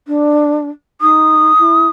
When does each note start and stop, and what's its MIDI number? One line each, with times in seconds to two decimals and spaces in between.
0.08 0.69 62
1.01 1.53 63
1.01 1.89 87
1.59 1.88 64